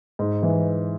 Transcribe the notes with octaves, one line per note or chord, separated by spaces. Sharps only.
G#2
E3